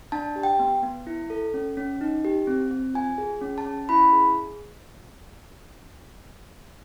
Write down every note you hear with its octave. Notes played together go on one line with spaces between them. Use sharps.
D4 A5
G4
G5
B3
B3
E4
A4
C#4
C#4
D#4
G4
C4
C4
F4 G#5
G#4
C#4
A5
C#4
E4 B5
G#4